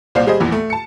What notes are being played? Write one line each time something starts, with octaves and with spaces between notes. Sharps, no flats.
C2 A#2 C5 D5 F5 C7
G3 G#4 C5 D#5
A#1 E2 A#2 E3
A3
A5 C#7